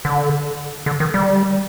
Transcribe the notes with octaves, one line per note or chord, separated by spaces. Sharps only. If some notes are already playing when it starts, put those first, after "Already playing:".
D3
D3
D#3
G3